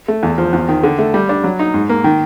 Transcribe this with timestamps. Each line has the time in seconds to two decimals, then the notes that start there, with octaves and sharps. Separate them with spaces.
0.08 A3
0.23 E2
0.38 F3
0.53 E2
0.68 D#3
0.83 D3
0.98 A3
1.14 G3
1.29 D4
1.44 F#3
1.59 D#4
1.74 G#2
1.89 A#3
2.04 D#3